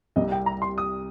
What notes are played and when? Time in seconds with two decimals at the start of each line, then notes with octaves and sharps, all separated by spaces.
0.16 C2 C3 G3 D#5
0.32 G5
0.46 A#5
0.62 C6
0.78 D#6